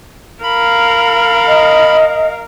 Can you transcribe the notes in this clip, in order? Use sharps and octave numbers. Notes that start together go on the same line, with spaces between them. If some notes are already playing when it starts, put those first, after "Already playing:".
A#4 F5 B5
D#5